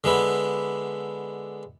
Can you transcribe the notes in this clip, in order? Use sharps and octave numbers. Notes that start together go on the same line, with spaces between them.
D3 G#3 B3 E4